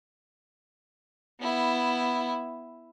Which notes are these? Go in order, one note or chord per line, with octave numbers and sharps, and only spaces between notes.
B3 E4